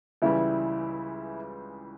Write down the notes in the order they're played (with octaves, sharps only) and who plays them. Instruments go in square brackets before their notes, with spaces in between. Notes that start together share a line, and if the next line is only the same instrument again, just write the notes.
[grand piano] C#2 C#3 E3 G3 [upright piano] E4